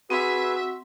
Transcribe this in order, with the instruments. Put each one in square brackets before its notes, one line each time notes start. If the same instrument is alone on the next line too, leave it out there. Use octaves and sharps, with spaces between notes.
[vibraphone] C4 [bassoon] F#4 [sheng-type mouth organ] G#4 B4 [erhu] E5